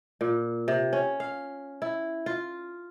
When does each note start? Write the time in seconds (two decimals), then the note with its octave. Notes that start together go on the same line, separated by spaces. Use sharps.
0.21 A#2
0.68 C3
0.93 C#4
1.20 F5
1.82 E4
2.26 F4